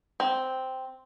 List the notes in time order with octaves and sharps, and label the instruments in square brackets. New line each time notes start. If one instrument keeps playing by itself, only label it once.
[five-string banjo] C4